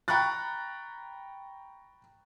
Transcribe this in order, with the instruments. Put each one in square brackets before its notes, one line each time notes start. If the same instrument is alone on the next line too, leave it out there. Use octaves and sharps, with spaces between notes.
[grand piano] G5 A#5 B5 C#6 F#6 A6